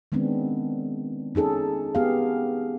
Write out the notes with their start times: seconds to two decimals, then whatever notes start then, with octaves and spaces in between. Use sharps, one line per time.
0.12 D#3 G#3 B3 C4 D4
1.35 C#4 D#4 G#4 A4
1.95 B3 G4 G#4 F5